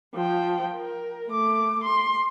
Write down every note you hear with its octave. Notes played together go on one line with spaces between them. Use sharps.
F3 G5
A#4
A3 D6
C6